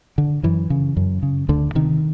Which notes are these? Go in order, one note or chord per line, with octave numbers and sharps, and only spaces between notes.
D3
F#2 E3
C#3
F#2
C#3
D2 D3
C3 D#3